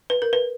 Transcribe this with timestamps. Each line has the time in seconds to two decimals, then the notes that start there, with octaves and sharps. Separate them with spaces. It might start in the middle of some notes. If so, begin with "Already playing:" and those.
0.10 B4
0.22 A#4
0.33 B4